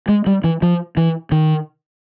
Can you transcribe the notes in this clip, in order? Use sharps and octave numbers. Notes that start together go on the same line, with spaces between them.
G#3
G3
E3
F3
E3
D#3